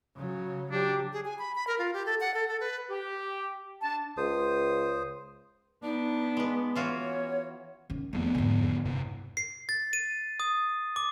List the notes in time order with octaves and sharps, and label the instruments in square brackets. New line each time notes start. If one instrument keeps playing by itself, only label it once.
[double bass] C#3 F#3
[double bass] F#3 [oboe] D4 [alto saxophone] G4
[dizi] G#4
G#5
B5
B5
A#4
F4
G4
A4
F#5
A4
A4
B4
[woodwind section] G4
D4 A5
[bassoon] C#2 [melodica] C5 D#6
[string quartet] B3 [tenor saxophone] D4 [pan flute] D#4
[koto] G#3 B4
[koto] E3 F4 F#4 [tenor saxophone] C#4 [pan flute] C#5
[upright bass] D#3 C#4
[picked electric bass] E1 F2 B3 [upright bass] A3
[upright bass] G#2 D3
[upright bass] E1 [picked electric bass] G2 C3
[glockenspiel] C7
A6
D#7
D#6
D6